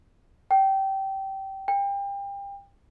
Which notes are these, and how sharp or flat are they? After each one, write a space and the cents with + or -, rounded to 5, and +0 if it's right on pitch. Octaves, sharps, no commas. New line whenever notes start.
G5 -20
G5 +30